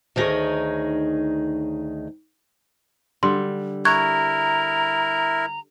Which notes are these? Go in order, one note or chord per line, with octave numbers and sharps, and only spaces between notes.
D2 D#3 D#4 G4 G#4 C#5
D3 G3 C6
E4 A#4 A#5 C#6 F#6 G#6